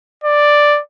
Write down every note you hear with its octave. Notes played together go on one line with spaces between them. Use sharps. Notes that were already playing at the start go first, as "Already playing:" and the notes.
D5